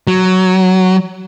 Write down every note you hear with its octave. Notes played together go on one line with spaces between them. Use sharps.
F#3